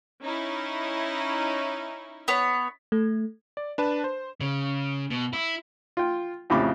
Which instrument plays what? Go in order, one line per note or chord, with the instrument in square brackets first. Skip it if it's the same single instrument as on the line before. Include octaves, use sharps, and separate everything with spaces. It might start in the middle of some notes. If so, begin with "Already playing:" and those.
[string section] C#4 D#4 E4
[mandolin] B3 C#5
[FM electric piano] A3
[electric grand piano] D5
D4 B4 A5
C5
[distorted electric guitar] C#3
B2
E4
[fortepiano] F4 G5
F2 A2 C#3 G4 B5 D6